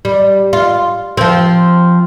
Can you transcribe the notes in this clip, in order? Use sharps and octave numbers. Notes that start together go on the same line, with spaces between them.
G3
F4
F3 C4